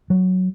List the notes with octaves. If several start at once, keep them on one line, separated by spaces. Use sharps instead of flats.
F#3